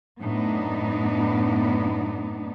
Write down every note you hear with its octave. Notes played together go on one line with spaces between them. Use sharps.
F#2 A2 B3 D4 D#4